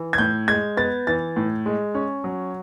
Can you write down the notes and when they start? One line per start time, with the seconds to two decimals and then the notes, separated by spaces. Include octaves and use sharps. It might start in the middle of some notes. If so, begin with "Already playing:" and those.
Already playing: E3
0.13 G#6
0.18 A2 G6
0.48 G#3 G#6
0.77 B3 A6
1.07 E3 A6
1.36 A2
1.66 G#3
1.95 C#4
2.24 F#3